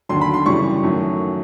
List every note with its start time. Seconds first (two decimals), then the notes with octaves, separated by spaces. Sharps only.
0.09 D#2 D3 F#3 C6
0.21 B5
0.34 C6
0.46 F#2 C#3 E3 G3 C#6
0.83 F#2 D#3 F#3 A3